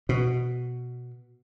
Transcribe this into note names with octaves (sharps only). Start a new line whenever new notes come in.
B2